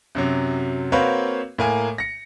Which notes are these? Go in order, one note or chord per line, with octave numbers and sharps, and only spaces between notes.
F#2 C3 F#3
A#3 C4 F#4 B4 C#5 F5
A2 A#3 G#5
A#6 C#7